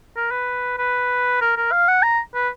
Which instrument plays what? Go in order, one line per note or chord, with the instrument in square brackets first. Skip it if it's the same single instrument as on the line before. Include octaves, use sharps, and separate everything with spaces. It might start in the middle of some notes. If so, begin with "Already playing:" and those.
[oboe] A#4
B4
B4
A#4
A#4
F5
F#5
A#5
B4